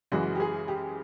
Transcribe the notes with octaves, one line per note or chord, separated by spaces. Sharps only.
F#2 C#3 E3 G#3 F#4
G4
G#4
G4